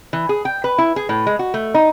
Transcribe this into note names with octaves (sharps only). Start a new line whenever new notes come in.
E3
G#4
G5
B4
E4
G#4
A2
G#3
F#4
A3
D#4